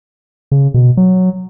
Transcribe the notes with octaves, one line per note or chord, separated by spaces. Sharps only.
C#3
B2
F#3